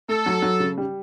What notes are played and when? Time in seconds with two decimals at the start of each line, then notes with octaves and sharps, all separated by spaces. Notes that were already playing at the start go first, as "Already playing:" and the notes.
0.09 A3 A4
0.26 F#3
0.42 F#3
0.60 C#3
0.78 G3